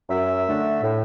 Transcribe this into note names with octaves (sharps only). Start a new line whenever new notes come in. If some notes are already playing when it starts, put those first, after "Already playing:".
F#2 E5
D3 A3 D4
A2